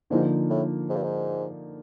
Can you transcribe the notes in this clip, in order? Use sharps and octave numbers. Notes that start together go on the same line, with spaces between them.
G#2 D3 F3 A#3 D#4
A2
G#2
G2
G#2